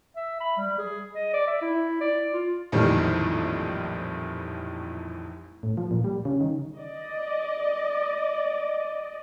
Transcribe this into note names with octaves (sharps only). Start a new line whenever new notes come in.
E5
B5
G3
G#4
D#5
D5
E5
E4
D5
F4
A#1 F2 A2 D#3 E3 G3
A2
F3
A#2
G3
C#3
D#3
D5 D#5